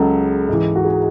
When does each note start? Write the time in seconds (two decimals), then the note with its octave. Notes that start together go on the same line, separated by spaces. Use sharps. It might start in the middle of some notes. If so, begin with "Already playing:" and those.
Already playing: C#2 C#3 F#3 A4
0.49 G#2 E3
0.76 F#4
0.85 G#4